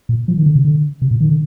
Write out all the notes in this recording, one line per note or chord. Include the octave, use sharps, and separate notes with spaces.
A#2
F3
D#3
D3
C3
D3
C3
A#2
D#3
D3